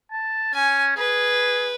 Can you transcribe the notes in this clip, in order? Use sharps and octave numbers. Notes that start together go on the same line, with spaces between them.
A5
C#4 G#5
G#4 B4